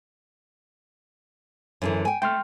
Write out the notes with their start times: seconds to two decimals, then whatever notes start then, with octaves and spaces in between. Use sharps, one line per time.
1.82 F#2 D3 E3
2.05 G5 G#5
2.22 A3 G5 C6 F6